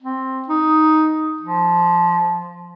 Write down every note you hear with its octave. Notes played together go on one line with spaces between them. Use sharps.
C4
D#4
F3